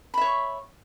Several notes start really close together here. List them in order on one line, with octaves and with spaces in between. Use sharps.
B5 E5 C#5 C#6